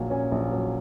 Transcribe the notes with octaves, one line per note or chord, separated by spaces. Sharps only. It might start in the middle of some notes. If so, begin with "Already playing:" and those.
Already playing: A#1 A#2 F#3
C#4 G#5
A#1
F#3